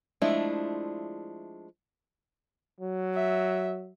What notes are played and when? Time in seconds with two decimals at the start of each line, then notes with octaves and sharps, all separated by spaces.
0.22 F3 G#3 A3 D4 E4
2.80 F#3
3.15 E5